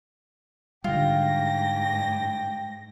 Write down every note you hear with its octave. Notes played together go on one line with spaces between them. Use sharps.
G#2 D3 G3 F4 G5 A#6